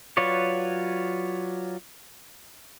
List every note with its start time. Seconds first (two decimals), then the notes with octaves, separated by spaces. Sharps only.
0.17 F#3 F4 B4 C#5 D5